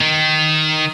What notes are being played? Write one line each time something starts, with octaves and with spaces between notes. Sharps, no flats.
D#3